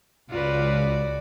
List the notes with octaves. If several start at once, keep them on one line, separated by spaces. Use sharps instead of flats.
C#2 F4 F#4 B4 D5